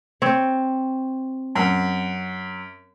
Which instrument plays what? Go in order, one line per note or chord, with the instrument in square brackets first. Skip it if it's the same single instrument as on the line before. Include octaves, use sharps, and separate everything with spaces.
[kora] C4 C#5
[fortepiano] F#2